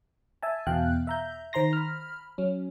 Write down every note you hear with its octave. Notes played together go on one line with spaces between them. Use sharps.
E5 G#5 A5
E2 B2 F5 G5 F#6
E5 A#5 G6
D#3 C5 A#5 C6 A#6
B5 F6
F#3 C#4